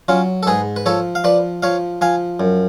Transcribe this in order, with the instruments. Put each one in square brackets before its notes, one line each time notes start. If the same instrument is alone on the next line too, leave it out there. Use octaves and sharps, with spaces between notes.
[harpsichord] F#3 C#4 F4
A4
G#2 G#4 B4
B4
F3 A4 C#5
F5
F3 B4 D5
F3 C#5 F5
F3 F5 G#5
F#2